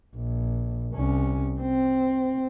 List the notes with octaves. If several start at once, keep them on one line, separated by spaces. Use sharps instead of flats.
A#1
C2 C#4
C4